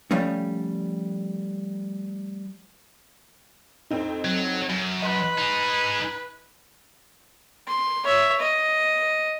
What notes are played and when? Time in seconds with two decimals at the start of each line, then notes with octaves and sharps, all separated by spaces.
0.11 F3 G3 A3 C#4
3.90 F2 C4 D#4
4.25 F#3
4.69 F#2
5.02 B4 D#5 C6 F#6
5.38 D#4 G#4
7.67 C6
8.04 C#5 E5
8.39 D#5